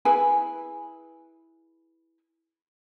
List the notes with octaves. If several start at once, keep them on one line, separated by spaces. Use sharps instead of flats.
E4 G#4 B4 G#5